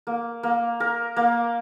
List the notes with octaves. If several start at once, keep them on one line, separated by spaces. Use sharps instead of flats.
A#3
A#3
A#4
A#3